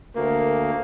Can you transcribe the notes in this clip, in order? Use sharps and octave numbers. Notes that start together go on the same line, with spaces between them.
D2 A#3 A#4